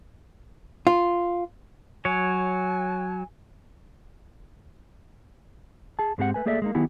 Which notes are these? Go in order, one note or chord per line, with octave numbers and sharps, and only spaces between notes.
F4
F#3 C#5 G#5
G#4 A5
G#2 G#3 C4 G4 G#4 F#5
A3 B4 G#5
A3 A#3 G#4 A4 D5 E5
G#3 A#3 D#4
D#3 F#3 B3 E4 G4 G#4